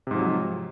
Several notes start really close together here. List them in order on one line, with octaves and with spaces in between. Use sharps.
C3 G#2 F3 F#3